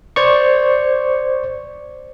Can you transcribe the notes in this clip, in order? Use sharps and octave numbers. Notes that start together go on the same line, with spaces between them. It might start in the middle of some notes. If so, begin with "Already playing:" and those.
C5 D5 C#6